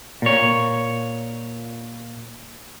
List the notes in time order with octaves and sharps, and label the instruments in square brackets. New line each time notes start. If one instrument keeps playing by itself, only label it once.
[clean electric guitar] A#2 C#5